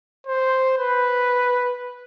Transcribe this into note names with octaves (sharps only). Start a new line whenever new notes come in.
C5
B4